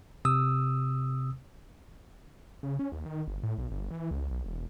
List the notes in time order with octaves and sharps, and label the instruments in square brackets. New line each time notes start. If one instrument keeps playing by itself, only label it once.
[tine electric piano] C3 D#6 E6
[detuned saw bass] C#3
C#4
D#2
D#3
G1
A2
B1
G1
E3
C#2
B1
E1